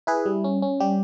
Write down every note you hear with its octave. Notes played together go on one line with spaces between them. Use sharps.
E4 G#4 B4
G3
C#4
C#4
G3 G4